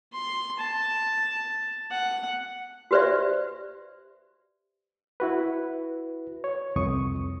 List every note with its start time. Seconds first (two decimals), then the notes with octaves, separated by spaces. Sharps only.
0.13 C6
0.59 A5
1.91 F#5
2.91 F#4 G4 B4 C5 D5 E5
5.20 E4 F#4 B4
6.44 C#5
6.76 C2 F2 C#6 D#6